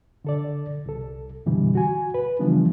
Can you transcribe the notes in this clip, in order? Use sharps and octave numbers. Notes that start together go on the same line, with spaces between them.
D3 A4 D5
C2 A4
F#2 B2 D3 E3 G3
F#4 G#5
B4
C#3 E3 F3 G3 B3 D4